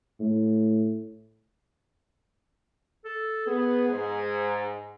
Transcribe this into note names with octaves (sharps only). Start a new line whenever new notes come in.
A2
A4
B3 G#4
G#2